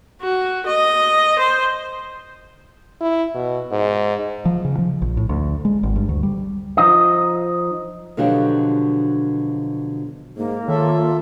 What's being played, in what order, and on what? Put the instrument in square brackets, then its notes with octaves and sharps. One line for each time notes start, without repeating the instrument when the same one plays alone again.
[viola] F#4
D#5
C5
[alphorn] E4
B2
G#2
[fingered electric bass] F3
C#3
F3
A#1
A2
D2
G#3
G#1
G2
D2
G3
[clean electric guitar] F3 D#4 D#5
[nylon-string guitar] B2 D3 F3 F#3 D4 G4
[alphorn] G#2 [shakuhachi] A#3
[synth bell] D#3 [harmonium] F4 A4 E5 [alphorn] C#5